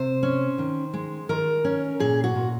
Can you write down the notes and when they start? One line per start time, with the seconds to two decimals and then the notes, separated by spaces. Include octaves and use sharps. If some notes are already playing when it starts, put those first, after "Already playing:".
Already playing: C3 C5
0.23 C#4
0.58 D#3
0.93 G#3
1.29 D#3 A#4
1.65 C#4
2.00 A#2 G#4
2.24 F#4
2.36 A#2